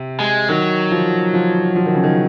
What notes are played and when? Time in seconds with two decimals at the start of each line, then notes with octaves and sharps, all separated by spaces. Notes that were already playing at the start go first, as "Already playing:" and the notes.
Already playing: C3
0.20 G#3
0.49 D#3 F#3
0.91 F3
1.34 F3
1.76 F3
1.86 D#3
1.95 C#3
2.04 D#3